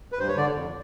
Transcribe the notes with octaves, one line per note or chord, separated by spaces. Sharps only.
B4
G2 C5
C#5
D3 D5
F2